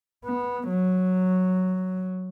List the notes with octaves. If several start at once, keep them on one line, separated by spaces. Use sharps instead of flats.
B3
F#3